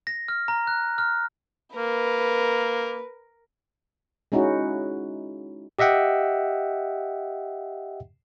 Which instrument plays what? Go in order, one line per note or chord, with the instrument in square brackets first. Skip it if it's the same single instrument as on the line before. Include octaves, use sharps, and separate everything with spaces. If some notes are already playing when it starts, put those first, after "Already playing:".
[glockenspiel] A#6
F6
A#5
F#6
F6
[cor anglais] A#3 [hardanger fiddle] A#4 [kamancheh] B4
[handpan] G#3 C#4 D#4 E4 F#4
[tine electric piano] G4 D#5 E5 F#5 G5